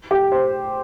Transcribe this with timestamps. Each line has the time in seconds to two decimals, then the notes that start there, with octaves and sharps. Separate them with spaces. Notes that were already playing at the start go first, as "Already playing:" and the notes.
0.11 G4
0.32 C5